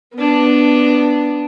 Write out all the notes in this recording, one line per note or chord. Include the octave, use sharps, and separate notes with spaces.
B3 D4